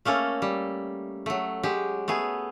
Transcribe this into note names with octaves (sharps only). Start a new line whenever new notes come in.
A3 A#3 C#4 A4
G3
F#3 A3
F#3 G#3 G4
A3 B3 G#4